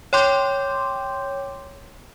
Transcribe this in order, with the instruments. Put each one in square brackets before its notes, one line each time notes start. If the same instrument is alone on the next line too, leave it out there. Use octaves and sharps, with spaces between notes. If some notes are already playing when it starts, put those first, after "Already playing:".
[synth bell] C#5 G5 C6 D6 G6